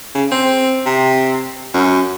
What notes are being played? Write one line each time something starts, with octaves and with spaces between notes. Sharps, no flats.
C#3
C4
C3
F#2